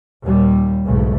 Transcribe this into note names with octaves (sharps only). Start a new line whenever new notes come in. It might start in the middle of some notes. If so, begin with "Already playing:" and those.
D#2 A#2 G3
B1 E2 G#2 C#3 A3